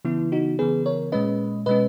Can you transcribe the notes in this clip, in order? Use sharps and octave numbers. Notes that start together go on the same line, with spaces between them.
C#3 E3 B3 E4
D#4 F#4
C#3 E3 B3 G#4 B4
A#4 C#5
A#2 G#3 C#4 B4 D#5
B2 G#3 C#4 B4 D#5